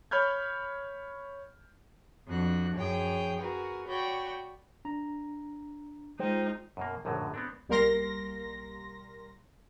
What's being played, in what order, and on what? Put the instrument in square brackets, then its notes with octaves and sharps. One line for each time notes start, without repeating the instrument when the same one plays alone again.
[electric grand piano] C#5 B5 F6 G6 G#6
[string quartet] F2 D4 F#4 F#6
F#2 F3 G#4 C#5 G5
F#4 G#4 A#4 B4
F#4 C#5 D5 G5 B5
[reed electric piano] D4 A#5
[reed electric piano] G#3 C5 G5 [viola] D#4 F4
[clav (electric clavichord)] F#2 B2 A#3
A#1 F#2 A2 D3 F#3
B3 C4 D4
[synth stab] B1 G3 A#3 A#4 C6 A#6